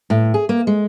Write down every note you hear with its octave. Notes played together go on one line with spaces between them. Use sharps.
A2
G#4
A#3
G#3